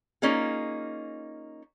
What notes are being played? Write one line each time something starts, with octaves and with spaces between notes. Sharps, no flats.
A#3 C#4 D#4 F4 G#4